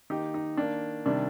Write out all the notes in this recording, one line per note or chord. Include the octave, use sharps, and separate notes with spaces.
D#3 A#3 D#4 G4
D#4
D#3 A#3 D4
C3 D#3 G3 D4